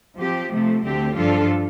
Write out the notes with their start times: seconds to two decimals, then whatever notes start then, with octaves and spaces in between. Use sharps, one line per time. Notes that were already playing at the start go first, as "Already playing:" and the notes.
0.20 F3 C4 G4
0.52 C3 F3 A3
0.84 D2 D3 A3 C4 G4
1.15 G2 F3 D4 F4 A4